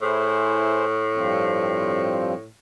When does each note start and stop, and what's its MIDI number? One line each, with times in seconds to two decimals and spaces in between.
0.02 2.47 45
0.02 0.85 64
0.02 0.85 68
0.02 0.85 72
1.15 2.34 43
1.15 2.34 53
1.15 2.34 60